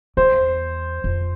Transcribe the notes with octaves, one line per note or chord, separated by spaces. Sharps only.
E2 C5
F2